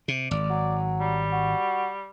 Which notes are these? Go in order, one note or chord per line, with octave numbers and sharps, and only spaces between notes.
C3
G#1 D5
F#3
G3
F#4